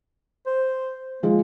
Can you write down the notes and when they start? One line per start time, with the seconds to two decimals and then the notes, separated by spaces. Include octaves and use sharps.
0.46 C5
1.23 F3 G#3 A#3 G#4